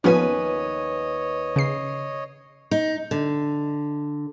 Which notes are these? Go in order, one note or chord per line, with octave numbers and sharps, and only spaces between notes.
D#2 F3 B3 C#4 B4 C#5 D#5 G#5
C#3 C7
D#4
D3